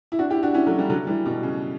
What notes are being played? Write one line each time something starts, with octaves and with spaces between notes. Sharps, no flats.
E4
D4 F#4
E4 G4
D4 F#4
C#4 E4
F#3 A3
E3 G3
D3 F#3
E3 G3
B2
C#3